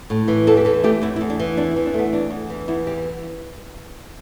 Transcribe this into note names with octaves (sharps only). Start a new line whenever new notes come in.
A2
E3
E2 A4
G4
E3 A4
A3 G4
E2 E4
E4
E2
D4
E3
E2 D4
E4
E3
D4
A3 B3
E2 D4
E2
E3
E2 E4
E3 G4